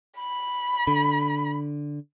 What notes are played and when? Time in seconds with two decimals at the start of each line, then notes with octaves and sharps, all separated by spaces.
0.18 B5
0.87 D3